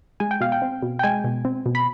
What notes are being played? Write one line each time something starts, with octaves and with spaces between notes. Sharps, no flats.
G#3 G#5
G5
B2 F5
G5
C4
B2
G5
G#3 G#5
B2
C4
B2
B5